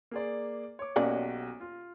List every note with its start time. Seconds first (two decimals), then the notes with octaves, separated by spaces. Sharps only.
0.11 A#3 G#4 D5
0.79 C#5 D6
0.96 B1 A#3 C#4 F#4 G4 D5
1.60 F4